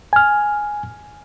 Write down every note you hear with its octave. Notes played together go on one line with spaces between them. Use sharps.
G#5 F6